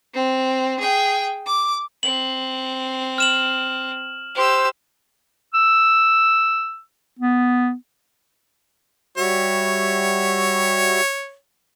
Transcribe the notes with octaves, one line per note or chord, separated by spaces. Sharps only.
C4
G#4 G5
D6
C4 F#7
F6 E7 F#7
G4 C5 E6
E6
B3
G3 F#4 C#5 E5